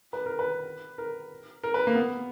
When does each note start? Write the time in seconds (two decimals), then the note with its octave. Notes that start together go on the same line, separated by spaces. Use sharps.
0.13 B4
0.26 A#4
0.39 B4
0.98 A#4
1.64 A#4
1.74 B4
1.87 A#3
1.95 B3